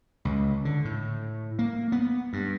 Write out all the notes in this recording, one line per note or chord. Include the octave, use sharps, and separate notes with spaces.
C#2
D3
A2
A#3
B3
G2